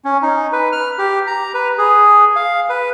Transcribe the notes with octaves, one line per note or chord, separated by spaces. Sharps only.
C#4
D#4
B4
F6
G4
A#5
B4
G#4
F5
B4